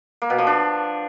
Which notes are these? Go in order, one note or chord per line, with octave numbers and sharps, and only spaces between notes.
A#3
B2
F3
D4